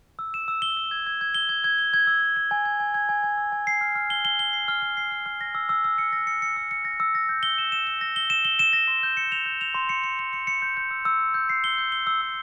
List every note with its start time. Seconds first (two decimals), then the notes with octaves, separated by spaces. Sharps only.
0.19 E6
0.34 E7
0.48 E6
0.62 G7
0.77 E6
0.91 G#6
1.07 G#6
1.21 G#6
1.35 G7
1.49 G#6
1.64 G#6
1.78 G7
1.94 G#6
2.07 E6
2.22 E6
2.36 G#6
2.51 G#5
2.65 G#6
2.80 G#5
2.94 G#6
3.09 G#5
3.23 G#5
3.38 E6
3.52 G#5
3.67 C7
3.81 F6
3.95 F6
4.10 G7
4.25 G7
4.39 G7
4.53 C7
4.68 F6
4.82 F6
4.97 C7
5.11 F6
5.26 F6
5.41 A#6
5.55 E6
5.69 E6
5.84 E6
5.98 C#7
6.13 A#6
6.27 C#7
6.42 C#7
6.56 E6
6.71 C#7
6.85 A#6
7.00 E6
7.15 A#6
7.29 G6
7.43 G7
7.58 E7
7.72 E7
7.87 E7
8.01 A#6
8.16 G7
8.30 E7
8.45 G7
8.59 E7
8.73 A#6
8.88 C6
9.03 G6
9.17 C#7
9.32 F7
9.46 G6
9.61 F7
9.74 C6
9.89 C#7
10.04 C#7
10.19 C#7
10.33 C#7
10.47 C#7
10.62 G6
10.77 G6
10.91 E6
11.05 E6
11.20 G6
11.34 G6
11.49 C7
11.64 G7
11.78 G6
11.92 G7
12.07 E6
12.21 E6